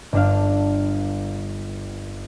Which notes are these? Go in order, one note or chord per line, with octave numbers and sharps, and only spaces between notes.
G1 D4 F5